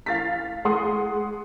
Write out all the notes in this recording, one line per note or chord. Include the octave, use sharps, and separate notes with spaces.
F5 A6 B6
G#3 F#5 C6 D#6